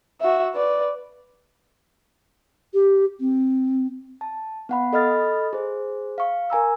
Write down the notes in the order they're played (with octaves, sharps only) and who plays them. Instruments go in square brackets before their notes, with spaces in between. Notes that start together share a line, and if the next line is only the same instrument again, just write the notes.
[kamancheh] F#4 E5
B4 D5
[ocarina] G4
C4
[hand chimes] A5
B3 F#5 B5
A4 D#5 B5 F6 A6
G#4 C5
F5 C#6
A#4 G#5 A#5 E6